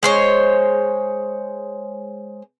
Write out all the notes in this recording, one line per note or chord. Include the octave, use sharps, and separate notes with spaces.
G#3 C5 C#5